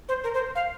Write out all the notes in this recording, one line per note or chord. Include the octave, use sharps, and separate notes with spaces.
C5
A#4
C5
F5